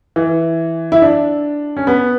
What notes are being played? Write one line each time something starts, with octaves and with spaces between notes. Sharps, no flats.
E3
E4
D4
C#4
B3